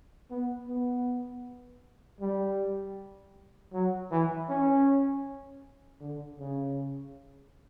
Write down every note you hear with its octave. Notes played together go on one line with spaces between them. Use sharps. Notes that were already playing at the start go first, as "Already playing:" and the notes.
B3
B3
G3
F#3
E3
C#4
D3
C#3